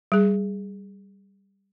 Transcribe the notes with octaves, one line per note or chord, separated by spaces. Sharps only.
G3 G#4